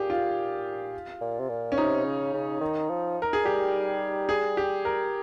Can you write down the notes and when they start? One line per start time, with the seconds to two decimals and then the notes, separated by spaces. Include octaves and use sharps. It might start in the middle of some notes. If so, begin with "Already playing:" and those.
Already playing: A#2 G4 G#4
0.10 F4
1.21 A#2
1.40 C3
1.50 A#2
1.72 C#4
1.78 C3 D#4
2.06 C#3
2.34 C#3
2.61 D#3
2.90 F3
3.22 A#4
3.33 G#4
3.45 G3 G4
4.29 G#4
4.57 G4
4.85 A#4